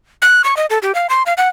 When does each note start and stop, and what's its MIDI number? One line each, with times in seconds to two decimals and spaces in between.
0.22 0.42 90
0.44 0.57 85
0.57 0.66 75
0.70 0.79 69
0.82 0.94 67
0.95 1.07 77
1.10 1.23 84
1.26 1.34 77
1.37 1.49 78